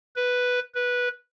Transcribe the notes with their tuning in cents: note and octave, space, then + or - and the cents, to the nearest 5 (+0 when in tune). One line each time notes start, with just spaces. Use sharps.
B4 +0
B4 -10